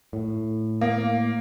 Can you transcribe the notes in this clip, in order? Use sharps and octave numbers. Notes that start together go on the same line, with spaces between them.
A2
A#3